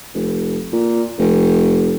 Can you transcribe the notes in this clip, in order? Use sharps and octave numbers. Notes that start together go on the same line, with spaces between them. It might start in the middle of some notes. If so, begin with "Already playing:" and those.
F1
A#2
F1